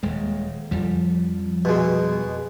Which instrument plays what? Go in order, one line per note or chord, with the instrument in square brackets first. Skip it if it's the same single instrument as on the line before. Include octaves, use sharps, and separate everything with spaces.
[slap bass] D#1 G#3
F2 F3 G3
[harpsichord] B2 G#3